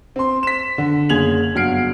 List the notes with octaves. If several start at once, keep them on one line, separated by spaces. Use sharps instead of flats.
C4 C6
B6 E7
D3
F#1 G#4 G#6 F7 F#7
G1 F#3 F#5 F6 C7 D7